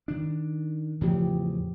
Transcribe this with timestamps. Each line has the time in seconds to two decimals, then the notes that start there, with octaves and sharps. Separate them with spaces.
0.08 D#3 D4
1.01 E2 A2 C#3 F3 G4